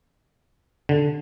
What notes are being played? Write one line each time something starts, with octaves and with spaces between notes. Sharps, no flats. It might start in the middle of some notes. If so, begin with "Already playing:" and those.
D3